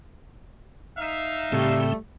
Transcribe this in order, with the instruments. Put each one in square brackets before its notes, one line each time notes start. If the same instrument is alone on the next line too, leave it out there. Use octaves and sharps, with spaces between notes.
[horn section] D#4 E5 F5
[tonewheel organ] A2 C#3 C4 [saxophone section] G3 A3